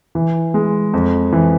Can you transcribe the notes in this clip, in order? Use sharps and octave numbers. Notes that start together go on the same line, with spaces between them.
E3
G#3
F2
E3